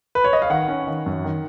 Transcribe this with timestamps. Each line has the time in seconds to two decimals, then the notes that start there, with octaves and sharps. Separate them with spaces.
0.15 B4
0.24 C#5
0.33 D#5
0.42 F5
0.50 D#3 F#5
0.68 C#4
0.87 D#3
1.06 F#2
1.24 D#3